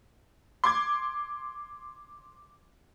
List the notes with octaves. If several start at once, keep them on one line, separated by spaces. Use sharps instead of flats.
C6 D6 G#6